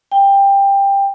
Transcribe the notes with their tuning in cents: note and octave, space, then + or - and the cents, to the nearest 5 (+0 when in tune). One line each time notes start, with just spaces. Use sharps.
G5 +15